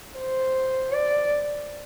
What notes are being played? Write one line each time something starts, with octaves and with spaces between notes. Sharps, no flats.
C5
D5